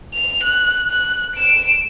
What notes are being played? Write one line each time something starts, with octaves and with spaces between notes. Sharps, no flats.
F7
F#6
F#6
D7 E7